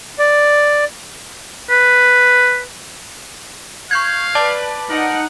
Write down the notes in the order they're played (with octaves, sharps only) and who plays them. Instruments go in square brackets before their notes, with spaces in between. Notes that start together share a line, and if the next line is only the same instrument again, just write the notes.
[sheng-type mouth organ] D5
[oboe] B4
[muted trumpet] F5 [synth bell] C#6 G6 G#6
[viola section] B4 [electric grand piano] D5 [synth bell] A5
[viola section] D#4 F#5 [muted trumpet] A#4